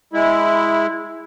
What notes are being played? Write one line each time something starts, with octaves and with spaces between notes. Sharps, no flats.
G#3 E4